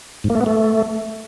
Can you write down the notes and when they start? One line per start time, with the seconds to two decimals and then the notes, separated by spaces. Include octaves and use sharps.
0.24 G#2
0.30 A#3
0.35 A3
0.41 B3
0.46 A3